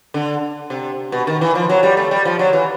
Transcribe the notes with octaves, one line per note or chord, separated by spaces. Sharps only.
D3
C3
B2
D#3
E3
F3
F#3
G3
A3
G3
F3
F#3
E3